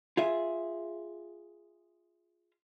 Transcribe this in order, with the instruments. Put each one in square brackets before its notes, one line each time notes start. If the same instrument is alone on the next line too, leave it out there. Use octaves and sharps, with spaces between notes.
[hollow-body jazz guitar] F4 G#4 E5